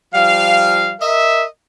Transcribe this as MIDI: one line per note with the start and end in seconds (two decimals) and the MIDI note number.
0.14 0.95 53
0.14 0.95 55
0.14 0.95 77
1.01 1.46 70
1.01 1.46 75
1.01 1.46 76